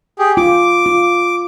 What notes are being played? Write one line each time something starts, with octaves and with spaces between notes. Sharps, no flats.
G4 G#4
F4 D6
F4